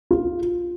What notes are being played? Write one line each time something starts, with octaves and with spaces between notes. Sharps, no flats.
F4